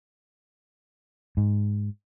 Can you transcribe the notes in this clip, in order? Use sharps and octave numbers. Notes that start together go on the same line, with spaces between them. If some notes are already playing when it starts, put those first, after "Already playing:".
G#2